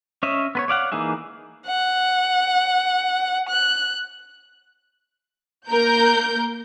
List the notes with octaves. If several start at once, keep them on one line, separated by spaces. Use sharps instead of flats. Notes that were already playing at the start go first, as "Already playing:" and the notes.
C#4 C#5 D#5 E5
B3 B4 C#5
C#5 D5 F5 F#5
E3 A#3 D#4 G#4 E5
F#5
F#6
A#3 A#4 G6